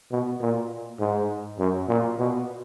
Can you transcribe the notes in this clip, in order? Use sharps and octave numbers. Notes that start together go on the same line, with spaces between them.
B2
A#2
G#2
F#2
A#2
B2